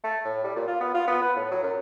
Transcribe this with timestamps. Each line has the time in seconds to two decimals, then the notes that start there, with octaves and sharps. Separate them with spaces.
0.04 A3
0.25 A2
0.44 G3
0.56 A#2
0.67 F4
0.80 B3
0.94 F4
1.08 B3
1.22 B4
1.36 A2
1.51 F#3
1.63 F#2